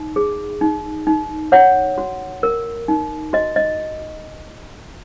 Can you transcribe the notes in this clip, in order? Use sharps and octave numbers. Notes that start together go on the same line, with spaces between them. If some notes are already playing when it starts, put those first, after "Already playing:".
Already playing: D#4
G#4
D#4
D#4
C#5 F#5
F#4
A#4
D#4
F#4 D#5
D#5